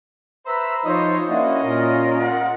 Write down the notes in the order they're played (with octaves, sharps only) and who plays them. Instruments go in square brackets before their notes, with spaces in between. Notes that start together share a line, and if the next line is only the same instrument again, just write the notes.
[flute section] B4 E5 E6 [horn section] C5 A#5 B5
[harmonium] F3 D#4 F4 [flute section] C5 [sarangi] C#5 [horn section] D#5
[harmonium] A#3 E4 F#4 [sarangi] C#4 [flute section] D4
[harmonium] A#2 [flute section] F4 A#4
[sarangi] F#5